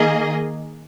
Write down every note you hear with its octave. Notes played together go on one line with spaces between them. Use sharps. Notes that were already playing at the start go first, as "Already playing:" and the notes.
Already playing: D#3 A#3 G#4 D#5